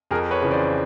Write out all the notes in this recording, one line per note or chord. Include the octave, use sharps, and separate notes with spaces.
F2 G#4 A#4
B4 C#5
C#3 E3
C5 D5